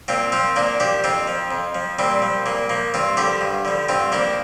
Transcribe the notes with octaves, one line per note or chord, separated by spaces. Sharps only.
A#2 C4 F4
F3 C4 F4
A#2 A#3 D4
F3 D4 G4
F2 C4 F4
F3
F2
F3
A#2 G3 C4
F3
A#2 A#3
F3 A#3
G2 C4 F4
D3 F3 D4 G4
G2
D3 F3
G2 C4 F4
F3 A#3 D4